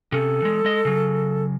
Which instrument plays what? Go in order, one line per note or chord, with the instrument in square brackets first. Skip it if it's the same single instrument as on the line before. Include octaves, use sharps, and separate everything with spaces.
[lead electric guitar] C3 C#4 [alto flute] A4
[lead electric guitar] E3 G#3
G#3 D#5
C#3 F#3